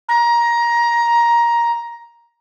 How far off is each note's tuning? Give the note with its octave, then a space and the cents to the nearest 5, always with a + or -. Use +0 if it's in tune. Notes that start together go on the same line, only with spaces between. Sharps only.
A#5 +15